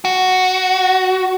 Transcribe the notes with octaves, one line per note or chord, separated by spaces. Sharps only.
F#4